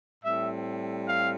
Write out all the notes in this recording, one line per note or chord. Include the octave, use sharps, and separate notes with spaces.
A2 G3 C4 E5
F5